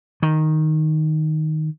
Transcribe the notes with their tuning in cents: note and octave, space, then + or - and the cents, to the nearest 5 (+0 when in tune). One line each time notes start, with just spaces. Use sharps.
D#3 +0